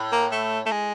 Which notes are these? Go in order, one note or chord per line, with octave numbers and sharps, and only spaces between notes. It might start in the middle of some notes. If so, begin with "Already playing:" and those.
Already playing: A2
A#3
A3
A3
G#3